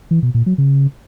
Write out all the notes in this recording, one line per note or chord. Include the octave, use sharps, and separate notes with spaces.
E3
B2
A#2
F#3
C#3